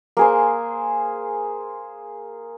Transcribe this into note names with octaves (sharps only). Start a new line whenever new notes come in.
A#3 G#4 C5